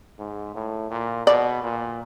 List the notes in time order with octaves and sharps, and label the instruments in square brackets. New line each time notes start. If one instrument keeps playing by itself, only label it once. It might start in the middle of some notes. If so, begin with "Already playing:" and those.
[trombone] G#2
A2
A#2
[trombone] B2 [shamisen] D5
[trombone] A#2